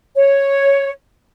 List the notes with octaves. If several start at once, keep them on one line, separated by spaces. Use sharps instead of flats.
C#5